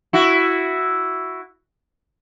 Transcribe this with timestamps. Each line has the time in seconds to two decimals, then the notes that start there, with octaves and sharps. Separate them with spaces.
0.13 E4 F#4